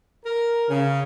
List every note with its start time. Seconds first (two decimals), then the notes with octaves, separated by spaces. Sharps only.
0.25 A#4
0.68 C#3